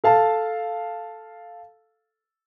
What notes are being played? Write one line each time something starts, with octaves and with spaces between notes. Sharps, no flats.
A4 F5 A5